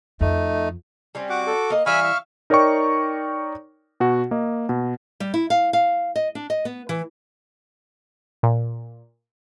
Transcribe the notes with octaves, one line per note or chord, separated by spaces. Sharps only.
F2 A3 D#4
G3 C4 C#4
F#4 F#5 D6
A4
A#3 D#5
E3 G3 E5 F5 G#5 B5 C#6 F6
E5
D#4 A#4 C#5 D5 G5 C#6
B2 F#4
A#3 D#5
B2
G3
E4
F5
F5
D#5
D4
D#5
B3
E3
A#2